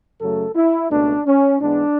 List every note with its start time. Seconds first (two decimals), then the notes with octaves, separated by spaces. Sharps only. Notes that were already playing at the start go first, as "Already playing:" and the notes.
0.20 F#2 C#3 F#3 A3 A4
0.56 E4
0.90 C#2 B2 A3 D4
1.25 C#4
1.60 G#2 E3 G#3 B3 D4